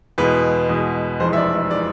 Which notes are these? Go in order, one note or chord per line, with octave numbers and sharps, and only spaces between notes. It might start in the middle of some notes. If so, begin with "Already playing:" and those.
E2 B2 G#3 B4
E2 B2 G#3
F1 F2 E3 G#3 C5
E5
D5
E5
E3 G#3 D5